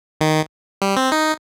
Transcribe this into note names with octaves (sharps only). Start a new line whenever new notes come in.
D#3
G3
C4
D#4